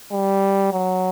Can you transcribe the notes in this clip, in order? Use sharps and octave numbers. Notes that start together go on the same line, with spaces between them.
G3
F#3